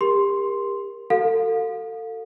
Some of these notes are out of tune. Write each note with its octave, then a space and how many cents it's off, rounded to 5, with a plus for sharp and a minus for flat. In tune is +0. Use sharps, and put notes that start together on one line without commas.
G4 +30 A#4 +15 C6 +0
F#4 +25 A4 +30 F5 +30